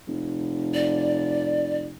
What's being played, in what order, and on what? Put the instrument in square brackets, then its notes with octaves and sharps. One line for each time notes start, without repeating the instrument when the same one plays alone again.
[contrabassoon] F1
[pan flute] D5